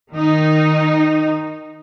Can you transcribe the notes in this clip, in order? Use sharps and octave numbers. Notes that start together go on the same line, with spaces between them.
D#3 D#4